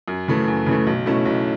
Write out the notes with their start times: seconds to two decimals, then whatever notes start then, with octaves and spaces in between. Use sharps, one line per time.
0.08 F#2
0.28 C#3 E3 A3
0.48 F#2
0.66 C#3 E3 A3
0.87 B1
1.06 B2 A3 C#4 E4
1.25 B1